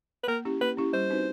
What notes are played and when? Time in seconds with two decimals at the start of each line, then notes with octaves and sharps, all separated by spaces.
0.24 B4
0.28 A#3 A#4
0.45 C#4 E4 G4
0.61 A#3 B4
0.77 C#4 E4 G4
0.93 G3 C5
1.10 C4 D#4 F#4 B4